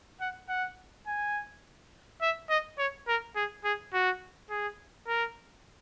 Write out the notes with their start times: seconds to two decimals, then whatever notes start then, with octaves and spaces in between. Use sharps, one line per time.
0.21 F#5
0.49 F#5
1.07 G#5
2.21 E5
2.49 D#5
2.78 C#5
3.08 A#4
3.36 G#4
3.64 G#4
3.93 F#4
4.50 G#4
5.07 A#4